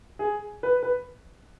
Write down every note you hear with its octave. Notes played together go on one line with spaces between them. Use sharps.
G#4
B4
B4